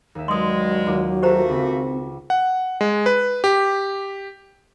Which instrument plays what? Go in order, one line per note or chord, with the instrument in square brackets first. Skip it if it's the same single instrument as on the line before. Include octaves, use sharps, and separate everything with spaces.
[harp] D#2 E5
[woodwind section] G2 G#3 [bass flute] F#3 [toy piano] C6 D#6
[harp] D#2 F4 D6
[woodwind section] A3 A#3 F#4 [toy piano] G4 C5 A#5
[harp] C#2 B6 [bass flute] C4
[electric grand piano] F#5
G#3
B4
G4